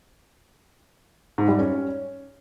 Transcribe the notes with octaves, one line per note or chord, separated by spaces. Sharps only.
G#2
G3
C#4